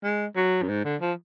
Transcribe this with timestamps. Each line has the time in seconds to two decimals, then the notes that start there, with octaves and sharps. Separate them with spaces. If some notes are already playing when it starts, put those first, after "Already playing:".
0.04 G#3
0.36 F#3
0.62 F#2
0.69 G#2
0.85 D3
1.01 F3